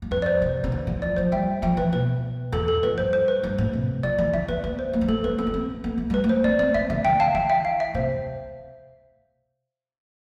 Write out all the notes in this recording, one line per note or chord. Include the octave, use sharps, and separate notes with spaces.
G2
F2 B4
D5
C5
C3
C3
D3
E3
F3 D5
F3 C5
G3 E5 G5
F3 E5 G5
E3 B4
B2 B4
E2 A4
A4
F2 B4
G2 C5
C5
B4
G2
A2
C3
F3 D5
E3 D5
D3 E5
B3 B4
B3 B4
C5
A3
G3
A3 A4
B3 B4
C4 A4
B3
C4
B3
A3
G3 B4
A3
C5
C4 D5
C4 D5
A3 E5
D3 E5
D3 E5 G5
F5 A5
E3 E5 G5
E5 G5
F5
E5
C3 C5